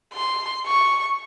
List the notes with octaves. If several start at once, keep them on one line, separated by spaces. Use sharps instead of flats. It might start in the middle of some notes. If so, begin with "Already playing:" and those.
C6
C#6